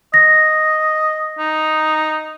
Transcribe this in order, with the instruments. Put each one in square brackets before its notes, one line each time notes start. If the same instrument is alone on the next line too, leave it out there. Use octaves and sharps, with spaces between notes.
[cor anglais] D#5 [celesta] A#6
[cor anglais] D#4